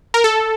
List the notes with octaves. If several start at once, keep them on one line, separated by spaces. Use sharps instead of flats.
A#4
A4